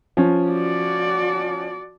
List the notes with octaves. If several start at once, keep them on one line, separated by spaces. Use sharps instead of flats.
F3 C#4
F#4 D5